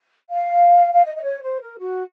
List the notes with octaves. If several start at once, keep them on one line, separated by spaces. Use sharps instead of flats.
F5
F5
D#5
D#5
C#5
C5
A#4
F#4